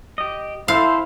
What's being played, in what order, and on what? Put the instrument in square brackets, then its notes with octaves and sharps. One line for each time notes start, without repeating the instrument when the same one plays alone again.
[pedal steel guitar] G4 D#5
[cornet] E4 [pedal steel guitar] A4 [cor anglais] C5 [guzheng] F5